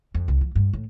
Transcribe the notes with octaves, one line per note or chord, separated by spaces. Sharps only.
F2
C2
F3
G2
A2